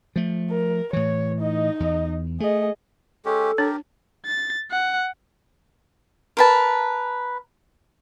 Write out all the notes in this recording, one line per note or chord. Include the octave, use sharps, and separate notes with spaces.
F3 A3
A#4
A2 E3 C#5
D#4 D#5
E2
A3 G#4 D#5
G#3 C#4 G4 A4
D4 G4 A#4 C#5
A6
F#5
A#4 B4 A5